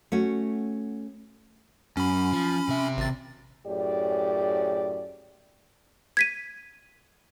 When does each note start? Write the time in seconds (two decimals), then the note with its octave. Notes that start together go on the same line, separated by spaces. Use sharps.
0.12 A3 C#4 F#4
1.97 F#2 C#4 B5
2.33 F3
2.69 C3 E5
2.97 G#1 A6
3.66 F#2 A2 G4 G#4 D5
6.17 G#6 B6 D#7